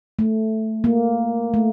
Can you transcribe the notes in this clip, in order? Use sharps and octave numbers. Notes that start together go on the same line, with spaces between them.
A3
A#3
A3